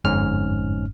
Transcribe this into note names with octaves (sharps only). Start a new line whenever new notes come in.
G1 F2 G#2 C#4 F6